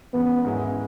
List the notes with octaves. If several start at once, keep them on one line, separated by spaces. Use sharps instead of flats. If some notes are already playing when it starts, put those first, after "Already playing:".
E1 E2 C#3 B3
G#2 D#3 G#3 C#4 E4